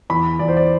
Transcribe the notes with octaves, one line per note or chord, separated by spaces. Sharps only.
E2 B5
E2 D5
C5
D5